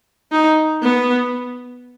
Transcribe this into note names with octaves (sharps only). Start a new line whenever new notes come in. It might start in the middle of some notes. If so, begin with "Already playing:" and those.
D#4
B3